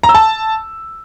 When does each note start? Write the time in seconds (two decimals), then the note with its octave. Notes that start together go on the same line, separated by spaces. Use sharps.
0.03 A#5
0.09 E6
0.15 A5